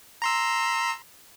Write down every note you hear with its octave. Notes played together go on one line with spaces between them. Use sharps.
A#5 C6 E6